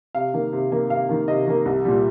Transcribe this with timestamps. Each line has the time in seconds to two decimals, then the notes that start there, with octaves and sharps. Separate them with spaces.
0.15 C3 F5
0.34 D#3 A#3
0.53 C3
0.72 D#3 A#3
0.90 C3 F5
1.09 D#3 A#3
1.28 C3 D#5
1.47 D#3 A#3
1.66 C2
1.85 A#2 G3